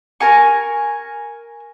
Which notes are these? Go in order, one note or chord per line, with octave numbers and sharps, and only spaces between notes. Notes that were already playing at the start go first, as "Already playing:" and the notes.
A#4 G#5 C#6